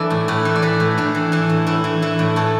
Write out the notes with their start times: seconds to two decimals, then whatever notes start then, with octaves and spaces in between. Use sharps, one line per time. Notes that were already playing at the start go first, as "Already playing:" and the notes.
Already playing: E3 D4 E4 A4 B4 D5
0.10 A2
0.28 A2 B4
0.45 E3
0.56 D5
0.62 E3 B4
0.80 A2
0.98 A2 D4
1.15 E3
1.32 E3 D4
1.50 A2
1.67 A2 E4
1.84 E3
2.02 E3 E4
2.19 A2
2.36 A2 A4